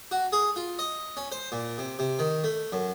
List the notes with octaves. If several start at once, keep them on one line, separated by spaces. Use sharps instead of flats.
F#4
G#4
F4
D#5
C#4
C5
A#2
C3
C3
D#3
A3
F#2